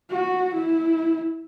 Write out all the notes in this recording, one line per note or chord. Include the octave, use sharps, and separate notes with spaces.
F#4
E4